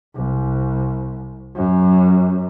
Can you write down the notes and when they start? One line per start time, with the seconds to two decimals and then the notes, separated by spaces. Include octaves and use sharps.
0.16 C2
1.56 F#2